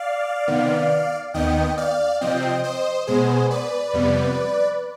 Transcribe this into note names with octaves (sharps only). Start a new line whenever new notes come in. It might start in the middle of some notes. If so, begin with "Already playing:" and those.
Already playing: D5 F5
C3 D#3 B3
D#2 D#3 B3 D#5 G5
D5 F5
C3 F3 C4 D#5 G5
C5 D#5
B2 G#3 B3 G#4 C5
B4 D5
F2 C3 G3 B3